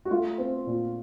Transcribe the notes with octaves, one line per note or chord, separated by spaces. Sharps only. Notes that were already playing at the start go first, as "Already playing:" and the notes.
F#4
A3 F4
C4
A#2